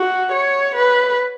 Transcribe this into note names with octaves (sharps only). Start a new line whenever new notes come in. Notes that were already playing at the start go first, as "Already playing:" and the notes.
Already playing: F#4
C#5
B4